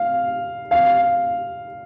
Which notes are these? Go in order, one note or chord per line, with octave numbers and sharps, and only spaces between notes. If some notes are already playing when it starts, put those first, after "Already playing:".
Already playing: F5
F5